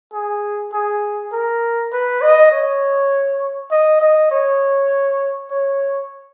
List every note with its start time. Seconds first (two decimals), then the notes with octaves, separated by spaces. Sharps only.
0.13 G#4
0.72 G#4
1.32 A#4
1.92 B4
2.21 D#5
2.52 C#5
3.71 D#5
4.01 D#5
4.31 C#5
5.50 C#5